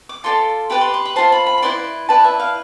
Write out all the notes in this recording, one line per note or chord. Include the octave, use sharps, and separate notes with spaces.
D6
F4 A4 D5 C6
G4 B4 D5 B5
C6
C6
B5
F4 C5 A5
B5
B5
B5
E4 B4 D5 C6
E4 B4 D5 A5
E5
F5